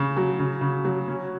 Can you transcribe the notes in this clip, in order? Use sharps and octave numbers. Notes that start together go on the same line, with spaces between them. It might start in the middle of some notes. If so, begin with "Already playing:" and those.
Already playing: C#3
F#3
C#3
C#3
F#3
C#4